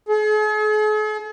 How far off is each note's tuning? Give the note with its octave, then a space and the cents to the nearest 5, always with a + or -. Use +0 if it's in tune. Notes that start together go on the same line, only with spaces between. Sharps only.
G#4 +45